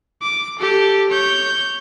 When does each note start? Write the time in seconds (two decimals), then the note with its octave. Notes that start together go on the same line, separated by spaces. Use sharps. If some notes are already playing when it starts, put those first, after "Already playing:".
0.22 D6
0.59 G4 A4
1.10 C#5 G6